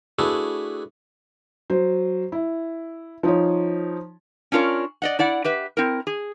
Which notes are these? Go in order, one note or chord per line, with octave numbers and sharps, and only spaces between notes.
A3 D4 E4 F#4 G#4 B4
F#3 C5
E4
F3 D#4 F4 C#5
C#4 D4 F4 A#4 C#5
D5 D#5 F#5
E4 D5 F#5
G4 B4 E5
C4 E4 A#4
G#4